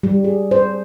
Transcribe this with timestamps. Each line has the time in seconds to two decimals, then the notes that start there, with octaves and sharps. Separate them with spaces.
0.03 G3
0.24 G#4
0.51 C5